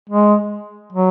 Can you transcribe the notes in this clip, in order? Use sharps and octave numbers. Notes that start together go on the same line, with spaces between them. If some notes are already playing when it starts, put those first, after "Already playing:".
G#3
F#3